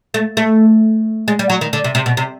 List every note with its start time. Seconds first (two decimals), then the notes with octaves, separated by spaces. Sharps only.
0.14 A3
0.37 A3
1.28 G#3
1.39 G3
1.50 F#3
1.61 D#3
1.73 D3
1.84 C3
1.95 C3
2.06 B2
2.17 C3